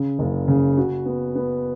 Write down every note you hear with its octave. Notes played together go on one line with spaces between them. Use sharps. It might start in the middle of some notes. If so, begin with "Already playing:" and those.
Already playing: C#3
F#1
C#3
F#4
B3
B3